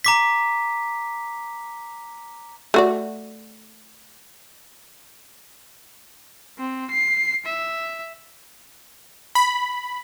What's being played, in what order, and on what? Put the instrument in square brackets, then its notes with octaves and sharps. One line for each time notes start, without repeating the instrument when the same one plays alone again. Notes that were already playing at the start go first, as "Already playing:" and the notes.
[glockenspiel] A#5 D6 B6
[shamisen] A3 F#4 D5
[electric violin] C4
C7
E5
[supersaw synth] B5